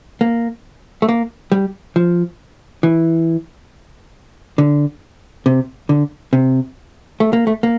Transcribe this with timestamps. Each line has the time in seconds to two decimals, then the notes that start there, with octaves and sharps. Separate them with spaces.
0.21 A#3
1.02 A3
1.09 A#3
1.52 G3
1.96 F3
2.83 E3
4.58 D3
5.46 C3
5.89 D3
6.33 C3
7.20 A3
7.33 A#3
7.47 A3
7.63 A#3